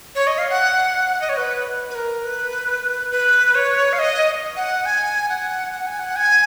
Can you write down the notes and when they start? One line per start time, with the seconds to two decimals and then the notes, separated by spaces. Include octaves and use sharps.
0.15 C#5
0.27 D#5
0.38 F5
0.50 F#5
1.21 D#5
1.29 C#5
1.37 B4
1.90 B4
1.95 A#4
2.24 B4
3.11 B4
3.55 C#5
3.93 F5
3.99 D#5
4.56 F#5
4.86 G#5
5.29 F#5
5.72 F#5
5.86 G#5
5.99 F#5
6.16 G#5